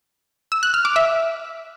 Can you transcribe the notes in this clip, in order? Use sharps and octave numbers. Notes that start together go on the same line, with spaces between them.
E6
F#6
F6
D6
E5